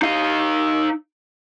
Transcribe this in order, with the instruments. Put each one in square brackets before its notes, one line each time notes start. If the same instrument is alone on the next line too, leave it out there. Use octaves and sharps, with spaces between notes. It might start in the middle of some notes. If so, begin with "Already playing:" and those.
[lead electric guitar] D#4 F5